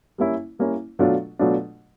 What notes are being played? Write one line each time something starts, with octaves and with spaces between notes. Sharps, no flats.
G3 A#3 C#4 E4
G3 A#3 C#4 E4
B2 F#3 A3 D4 F4
B2 F#3 A3 D4 F4